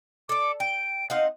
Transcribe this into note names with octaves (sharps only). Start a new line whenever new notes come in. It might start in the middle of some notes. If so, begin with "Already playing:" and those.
A4 D5 D6
G5 D7
C4 D#4 F5 F#5